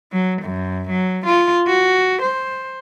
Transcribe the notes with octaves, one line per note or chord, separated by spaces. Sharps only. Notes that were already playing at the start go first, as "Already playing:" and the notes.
F#3
F#2
F#3
F4
F#4
C5